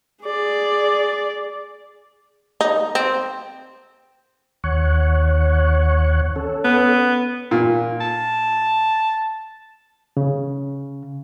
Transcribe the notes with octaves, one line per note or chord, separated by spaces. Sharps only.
G#4 D5
D#4
C4
D#2 C#5 F#5
C#4 A4
B3
A#2
A5
C#3